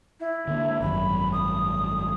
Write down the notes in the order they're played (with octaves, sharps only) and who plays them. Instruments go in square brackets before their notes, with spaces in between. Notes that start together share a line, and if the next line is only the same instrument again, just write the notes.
[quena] E4
[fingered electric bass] D3 A#3
[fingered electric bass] G#1 F#2 [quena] B5
[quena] D#6